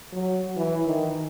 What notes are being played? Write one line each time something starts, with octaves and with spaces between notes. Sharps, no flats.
F#3
E3
D#3